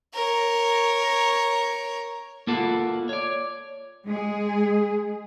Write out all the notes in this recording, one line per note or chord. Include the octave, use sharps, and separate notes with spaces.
A#4 C#5
A#3 F4 F#4 A4 B4
C#5 D5
G#3 G#4